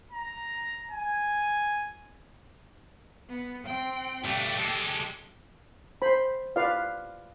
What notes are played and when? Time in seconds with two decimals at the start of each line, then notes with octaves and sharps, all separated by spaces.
0.12 A#5
0.90 G#5
3.30 B3
3.65 C4 G5
4.24 G2 A3 G4
4.59 G#3 A4
6.02 C5 B5
6.56 F4 B4 D5 F5